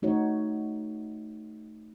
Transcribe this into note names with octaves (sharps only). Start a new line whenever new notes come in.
A3 D#4 F#4 C#5